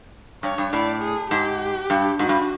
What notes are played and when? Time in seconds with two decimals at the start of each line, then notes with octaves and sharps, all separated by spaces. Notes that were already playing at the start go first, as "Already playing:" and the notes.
0.43 G2 C#5
0.58 G2
0.73 A2 D5
1.02 G#4
1.31 G#2 G4
1.90 G2
2.19 G#2 F#4
2.29 G2